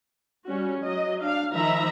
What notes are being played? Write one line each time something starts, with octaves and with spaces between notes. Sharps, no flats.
G3 C#4 F#4
F#3 D#5
D4 F5
D#3 F3 D#4 E5 A#5 B5